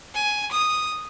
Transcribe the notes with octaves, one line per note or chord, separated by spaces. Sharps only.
G#5
D#6